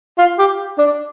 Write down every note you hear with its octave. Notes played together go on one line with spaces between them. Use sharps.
F4
G4
D4